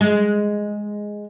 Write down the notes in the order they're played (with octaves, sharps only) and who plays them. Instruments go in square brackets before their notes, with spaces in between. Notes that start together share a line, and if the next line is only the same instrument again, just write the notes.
[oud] G#3